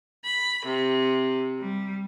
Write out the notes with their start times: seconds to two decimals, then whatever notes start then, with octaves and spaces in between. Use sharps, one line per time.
0.23 B5
0.63 C3
1.58 G3